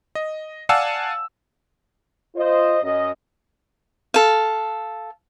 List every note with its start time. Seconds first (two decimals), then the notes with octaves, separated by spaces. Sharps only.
0.15 D#5
0.69 D5 F5 F#5 G#5 A5 E6
2.36 F4 C5 D#5
2.82 F#2 D#5
4.14 A4 F5